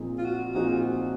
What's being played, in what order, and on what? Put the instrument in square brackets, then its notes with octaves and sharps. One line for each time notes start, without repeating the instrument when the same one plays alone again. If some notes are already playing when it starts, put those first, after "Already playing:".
Already playing: [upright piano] A#2 F3 C4 D#4 G#4
[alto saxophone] F4
F#4
[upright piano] A#2 F3 C4 D#4 G#4 [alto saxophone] F#4
[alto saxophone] F4
F#4